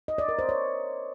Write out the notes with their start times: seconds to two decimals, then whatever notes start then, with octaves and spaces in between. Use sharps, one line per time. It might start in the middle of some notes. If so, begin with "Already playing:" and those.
0.08 D#5
0.18 D5
0.28 A#4
0.39 C5
0.49 C#5